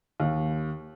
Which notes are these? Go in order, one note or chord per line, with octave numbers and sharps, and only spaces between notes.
D#2